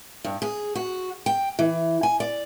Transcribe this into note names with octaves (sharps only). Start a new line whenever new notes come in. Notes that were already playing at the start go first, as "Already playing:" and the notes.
G2
G#4
F#4
G5
E3
G#5
D5